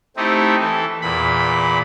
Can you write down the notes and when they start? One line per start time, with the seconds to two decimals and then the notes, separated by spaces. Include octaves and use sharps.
0.17 A3 C4 D#4 E4 G4
0.59 E3 A4
1.02 E2 A#2 B5